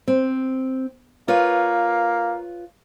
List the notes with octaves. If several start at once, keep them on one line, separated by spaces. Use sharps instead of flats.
C4
A#3 F4 B4 C#5